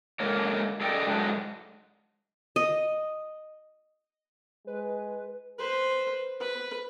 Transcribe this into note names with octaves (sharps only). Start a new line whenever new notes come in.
D3 G#3 A#3 A#4 C#5
G#4 A4 D5 D#5 F5 G5
G#2 D3 F#3 G#3
D#5
G#3 B4
B4 C5
B4